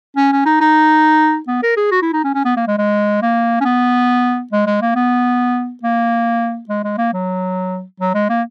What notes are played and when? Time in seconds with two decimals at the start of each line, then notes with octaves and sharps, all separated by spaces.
0.17 C#4
0.32 C#4
0.46 D#4
0.61 D#4
1.48 B3
1.63 A#4
1.77 G#4
1.91 F#4
2.02 E4
2.13 D#4
2.24 C#4
2.35 C#4
2.45 B3
2.57 A#3
2.67 G#3
2.78 G#3
3.22 A#3
3.61 C#4
3.65 B3
4.53 G#3
4.67 G#3
4.82 A#3
4.95 B3
5.83 A#3
6.69 G#3
6.84 G#3
6.98 A#3
7.13 F#3
8.00 F#3
8.14 G#3
8.29 A#3